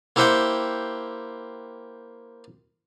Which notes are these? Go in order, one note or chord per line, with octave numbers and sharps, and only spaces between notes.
A#3 E4 G4 C5 F#5 G5